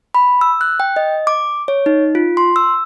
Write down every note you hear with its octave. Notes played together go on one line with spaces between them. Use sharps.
B5
E6
F#6
G5
D#5
D6
C#5
D#4
F4
C6
E6